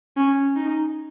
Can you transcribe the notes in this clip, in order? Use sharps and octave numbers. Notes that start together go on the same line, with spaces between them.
C#4
D#4